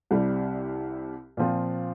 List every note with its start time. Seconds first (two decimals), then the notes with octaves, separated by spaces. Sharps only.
0.11 C2 C3 G3
1.37 A#2 F3 C4 F4